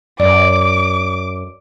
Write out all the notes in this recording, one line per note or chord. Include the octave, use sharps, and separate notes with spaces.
F#2 D5 D6